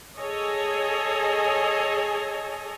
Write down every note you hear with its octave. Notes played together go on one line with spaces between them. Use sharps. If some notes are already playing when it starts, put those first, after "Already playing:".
G#4 A4 C#5 D#5 G#5